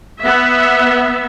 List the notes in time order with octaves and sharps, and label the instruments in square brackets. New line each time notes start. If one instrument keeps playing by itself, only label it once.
[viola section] B3 E5